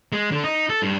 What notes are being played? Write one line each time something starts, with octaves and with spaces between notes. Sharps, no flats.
G#3
D3
D#4
A4
G2